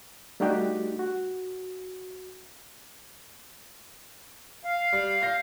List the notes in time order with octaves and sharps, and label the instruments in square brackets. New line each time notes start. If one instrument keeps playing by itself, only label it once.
[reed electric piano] G3 A3 D4 D#4 F#4 G4
F#4
[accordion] F5
[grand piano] G3
G6 A#6 C7